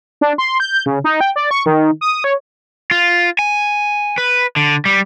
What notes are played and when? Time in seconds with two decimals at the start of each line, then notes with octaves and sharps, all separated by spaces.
0.21 D4
0.38 C6
0.60 G6
0.86 C#3
1.04 D#4
1.21 G5
1.36 D5
1.51 C#6
1.66 D#3
2.01 D#6
2.24 C#5
2.91 F4
3.39 G#5
4.18 B4
4.56 D3
4.85 G3